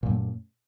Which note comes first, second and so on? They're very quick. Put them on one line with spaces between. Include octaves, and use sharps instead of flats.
A#2 F#2 A3